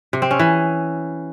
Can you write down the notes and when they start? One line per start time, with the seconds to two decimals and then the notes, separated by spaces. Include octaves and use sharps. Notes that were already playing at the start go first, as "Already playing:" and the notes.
0.13 C3
0.22 C4
0.31 C#4
0.39 E3